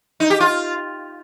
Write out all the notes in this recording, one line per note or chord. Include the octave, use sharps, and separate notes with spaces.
D#4
G4
F4